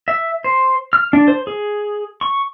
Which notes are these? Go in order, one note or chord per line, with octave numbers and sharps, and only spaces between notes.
E5
C5
F6
D4
C5
G#4
C#6